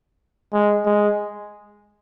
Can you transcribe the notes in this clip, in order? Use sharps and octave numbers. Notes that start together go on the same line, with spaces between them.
G#3
G#3